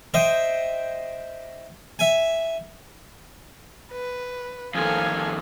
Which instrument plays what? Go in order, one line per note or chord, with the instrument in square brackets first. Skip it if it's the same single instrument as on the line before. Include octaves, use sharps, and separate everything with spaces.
[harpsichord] C5 D#5 E5 G5
E5 G#5
[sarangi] B4
[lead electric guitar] F2 D#3 [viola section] C4 A4 G#5 [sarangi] F5